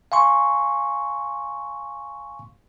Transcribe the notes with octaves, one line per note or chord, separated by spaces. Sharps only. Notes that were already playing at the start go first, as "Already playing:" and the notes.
F5 G#5 C6 C#6